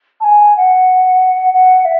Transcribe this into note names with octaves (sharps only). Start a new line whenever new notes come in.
A5
G#5
F#5
F#5
E5